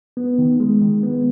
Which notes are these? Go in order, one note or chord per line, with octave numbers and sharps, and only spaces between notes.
B3
D#3
G#3
D#3
B3